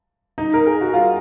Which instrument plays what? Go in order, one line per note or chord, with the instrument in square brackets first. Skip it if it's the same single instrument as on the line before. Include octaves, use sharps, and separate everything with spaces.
[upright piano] D#4
A#4
G#4
F#4
F4